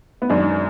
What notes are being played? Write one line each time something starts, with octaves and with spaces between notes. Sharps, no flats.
B3
F#2 D#3 G#3 D4